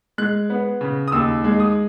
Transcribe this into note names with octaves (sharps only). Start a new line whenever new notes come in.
G#3 F#6
B3
C#3
D#6
D#2 E6
G#3
D#6